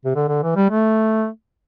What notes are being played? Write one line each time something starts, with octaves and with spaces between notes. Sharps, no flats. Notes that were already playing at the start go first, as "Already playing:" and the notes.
C3
D3
D3
E3
G3
A3